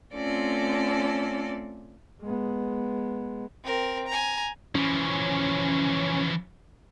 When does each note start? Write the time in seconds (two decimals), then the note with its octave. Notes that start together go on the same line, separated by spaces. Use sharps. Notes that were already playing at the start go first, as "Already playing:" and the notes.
0.14 A3 C4 C#4 F4 A4 D5
2.21 G#3 B3
3.64 C4 A#4
4.08 G#5 A#5
4.75 E3 F3 C#4